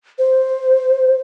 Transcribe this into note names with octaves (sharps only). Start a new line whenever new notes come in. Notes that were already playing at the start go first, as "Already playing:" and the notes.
C5